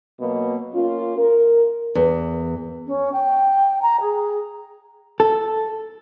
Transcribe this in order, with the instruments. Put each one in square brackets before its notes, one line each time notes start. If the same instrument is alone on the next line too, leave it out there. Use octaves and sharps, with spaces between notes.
[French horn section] B2 F#3 A#3
A#3 C#4 F4
A#4
[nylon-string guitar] E2
[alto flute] C#4
G5
A#5
G#4
[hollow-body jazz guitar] A4